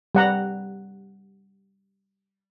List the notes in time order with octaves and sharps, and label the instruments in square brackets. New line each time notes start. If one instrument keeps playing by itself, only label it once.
[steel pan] G3 F#5 A#5